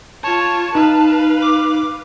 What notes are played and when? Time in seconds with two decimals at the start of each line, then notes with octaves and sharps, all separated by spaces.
0.24 F4 C#5 A5
0.75 D#4 B4 F5
1.42 D6